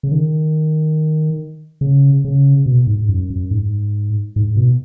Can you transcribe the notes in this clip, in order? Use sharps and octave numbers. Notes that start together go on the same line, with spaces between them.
C#3
D#3
C#3
C#3
B2
G#2
F#2
F#2
G#2
G#2
B2